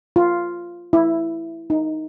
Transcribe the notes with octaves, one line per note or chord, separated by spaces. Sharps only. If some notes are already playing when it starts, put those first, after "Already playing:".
F4
E4
D#4